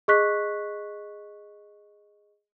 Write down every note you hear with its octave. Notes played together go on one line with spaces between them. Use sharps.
G#4 D#5 C#6 F#6 B6